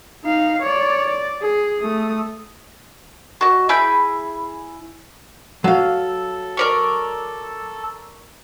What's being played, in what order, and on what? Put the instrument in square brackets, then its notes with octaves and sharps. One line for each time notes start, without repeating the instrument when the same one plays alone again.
[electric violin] D#4 F5
C#5 D5
D5
G#4
A3 D#6
[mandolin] F#4 D#5
E4 G#4 B5 G6
[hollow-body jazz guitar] F#3 F5 [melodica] A4
[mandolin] A#4 D5 C#6